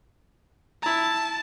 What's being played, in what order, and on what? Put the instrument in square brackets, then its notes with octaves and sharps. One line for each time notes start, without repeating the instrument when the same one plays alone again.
[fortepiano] E4 A#5 [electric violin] A5